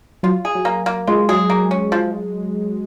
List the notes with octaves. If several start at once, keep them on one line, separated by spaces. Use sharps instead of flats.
F#3 F4
G#4
F#3
A#3
A#3
G#3 F4
F#3 G#4
A#3
C#4
F3